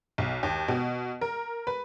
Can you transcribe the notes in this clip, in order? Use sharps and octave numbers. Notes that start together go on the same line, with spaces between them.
B1
D#2
B2
A#4
B4